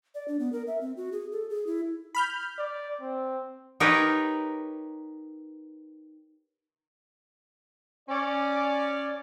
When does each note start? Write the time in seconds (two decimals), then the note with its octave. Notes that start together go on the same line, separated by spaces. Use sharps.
0.15 D5
0.28 D4
0.39 B3
0.52 A#4
0.67 E5
0.81 C4
0.97 F#4
1.12 G#4
1.32 A4
1.50 G#4
1.67 E4
2.15 B5 F6 G6
2.58 D5
3.01 C4
3.80 D#4 G4 A#4 B4 C#5
8.09 C#4 D5